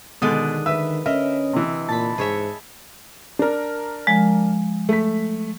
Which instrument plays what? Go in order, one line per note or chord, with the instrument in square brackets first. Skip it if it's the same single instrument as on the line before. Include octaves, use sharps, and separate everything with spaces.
[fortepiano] B2 [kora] D3 G#3 D5 [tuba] D#3 [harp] D#6 F#6
[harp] B4 [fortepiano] E5 E6
[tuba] C#4 [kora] A#4 [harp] D#5 [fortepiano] E5
[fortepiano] C3 E3
[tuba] A#2 [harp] A5 B5
[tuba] G#2 [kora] G#4 C#5 E5
[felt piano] D4 A#4
[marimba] F3 G#3
[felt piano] A3 B6